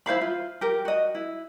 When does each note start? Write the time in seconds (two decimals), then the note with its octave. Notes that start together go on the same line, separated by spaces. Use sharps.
0.06 E4 C5 F5 B5
0.21 F4
0.61 G4 A#4
0.85 F#4 D#5
1.15 E4